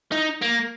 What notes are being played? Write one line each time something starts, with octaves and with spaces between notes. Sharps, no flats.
D#4
A#3